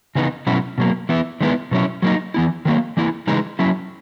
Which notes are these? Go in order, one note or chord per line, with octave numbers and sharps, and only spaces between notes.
C#3 E3 B3 D#4
B2 F#3 C#4 E4
B2 F#3 A#3
E3 B3 E4
D#3 G#3 B3 E4
B2 F#3 C#4 E4
F#3 A#3 D#4
E3 B3 E4
D#3 F#3 A#3
E3 A#3 E4
C#3 E3 G#3 D#4
F#3 C#4 E4